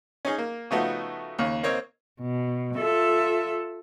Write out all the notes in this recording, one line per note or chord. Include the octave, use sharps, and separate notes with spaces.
C#4 D#4 G#4
A#3
C#3 F3 A3 B3 D#4 F#4
D#2 C#3
A#3 C4 C#5 D#5
B2
F4 A4 E5